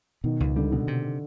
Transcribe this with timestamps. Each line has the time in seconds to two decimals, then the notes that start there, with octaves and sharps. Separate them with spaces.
0.24 B2 D#3
0.40 C#2
0.56 D3 G3
0.71 B2 D3
0.88 C3